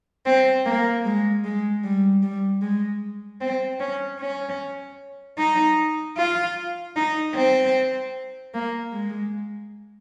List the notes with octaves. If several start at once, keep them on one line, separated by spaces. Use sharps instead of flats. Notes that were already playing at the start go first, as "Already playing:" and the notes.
C4
A#3
G#3
G#3
G3
G3
G#3
C4
C#4
C#4
D#4
F4
D#4
C4
A#3
G#3